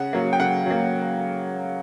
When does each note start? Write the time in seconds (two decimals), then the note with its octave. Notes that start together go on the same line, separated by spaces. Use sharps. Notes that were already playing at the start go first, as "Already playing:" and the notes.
Already playing: C#3 F#5
0.13 F#3 A#3
0.33 G5
0.40 C#3 F#5
0.66 F#3 A#3